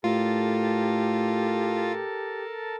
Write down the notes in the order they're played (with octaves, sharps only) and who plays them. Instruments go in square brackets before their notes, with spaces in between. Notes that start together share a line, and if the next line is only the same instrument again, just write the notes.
[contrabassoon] A2 [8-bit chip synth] F4 [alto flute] G4 [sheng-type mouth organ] A4 A#4 A5